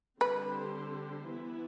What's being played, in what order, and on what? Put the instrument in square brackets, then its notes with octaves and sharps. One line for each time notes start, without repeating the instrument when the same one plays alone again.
[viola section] D3 G3 C4 G4 C5 [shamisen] B4
[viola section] E3 B3 E4